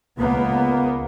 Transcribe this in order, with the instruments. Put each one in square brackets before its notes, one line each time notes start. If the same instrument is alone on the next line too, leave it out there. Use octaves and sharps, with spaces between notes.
[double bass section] C#2 A#3 B3